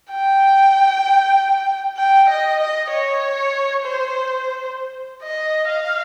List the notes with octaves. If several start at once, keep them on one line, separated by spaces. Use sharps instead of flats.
G5
G5
D#5
D#5
C#5
C5
D#5
F5